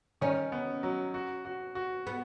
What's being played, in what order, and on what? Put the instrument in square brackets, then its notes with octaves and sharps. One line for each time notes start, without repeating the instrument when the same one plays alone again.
[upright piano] D#3 [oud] C#4
[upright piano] B3
F#3
F#4
F#4
F#4
[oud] B3